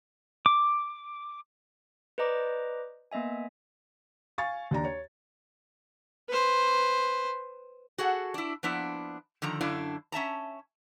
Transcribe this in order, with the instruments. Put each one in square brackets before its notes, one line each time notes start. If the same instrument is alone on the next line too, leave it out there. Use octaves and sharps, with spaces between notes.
[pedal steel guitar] D6
[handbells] B4 C5 D5 D#5 A#5 D6
A#3 B3 D#5 E5 G#5
[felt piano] F5 G#5 C#6 A6
D#2 D4 A#5
C#5
[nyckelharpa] B4 C5
[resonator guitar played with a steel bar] F#4 G#4 A4 F#5
D4 E4
F3 A#3 B3 D4 E4
D3 D#3 F3 A#5
F#2 D3 D4 E4 F5
C#4 E5 A5 A#5